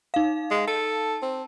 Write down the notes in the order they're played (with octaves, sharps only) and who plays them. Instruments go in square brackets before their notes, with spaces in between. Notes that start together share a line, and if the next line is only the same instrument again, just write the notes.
[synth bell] D#4 F5
[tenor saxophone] G#3
[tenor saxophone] A4 [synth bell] A5
[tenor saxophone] C4